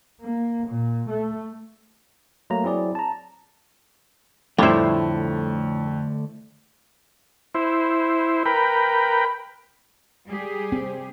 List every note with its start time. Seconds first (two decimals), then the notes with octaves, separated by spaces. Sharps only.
0.21 A#3
0.68 A#2
1.10 A3
2.50 F#3 A3 A#3 A#5
2.63 F#3 C4 E4 G#4 D5
2.95 A5 A#5
4.58 F2 A2 D3 G3 A3 E4 C5
7.55 E4 C5
8.46 A#4 B4 G5 B5
10.27 G3 G4 G#4
10.72 C4